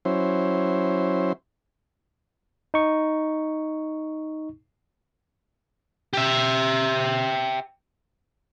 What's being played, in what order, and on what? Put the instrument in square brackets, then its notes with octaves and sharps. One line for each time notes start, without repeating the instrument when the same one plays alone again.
[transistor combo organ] F#3 C#4 E4 C5
[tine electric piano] D#4 C#6
[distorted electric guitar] G4 E5